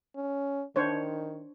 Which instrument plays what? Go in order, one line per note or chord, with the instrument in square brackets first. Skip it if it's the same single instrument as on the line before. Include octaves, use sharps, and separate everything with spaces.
[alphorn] C#4
[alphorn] D#3 [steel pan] D4 C5 C#5